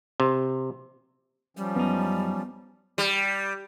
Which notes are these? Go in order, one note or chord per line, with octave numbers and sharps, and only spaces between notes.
C3
F3 G3 C#4
F#2 B3 D#4
G3